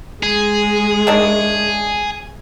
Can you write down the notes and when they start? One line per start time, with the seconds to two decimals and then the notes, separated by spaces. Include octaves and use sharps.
0.23 G#3 G#4
1.07 D#3 A3 D4